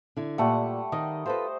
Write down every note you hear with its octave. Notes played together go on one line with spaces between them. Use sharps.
D3 E4
A#2 G3 A3 F#5
D#3 D#5
F4 A4 B4 C5